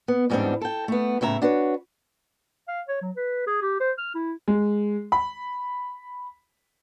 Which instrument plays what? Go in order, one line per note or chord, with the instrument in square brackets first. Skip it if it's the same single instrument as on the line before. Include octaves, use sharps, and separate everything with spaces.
[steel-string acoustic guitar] B3
E2 G#2 G3 B3 C4 D4
A4 G5
A3 B3
A2 C#3 E5 A#5
D4 F#4 B4 C#5
[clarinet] F5
C#5
F#3
B4
G#4
G4
C5
F6
E4
[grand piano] G#3
B5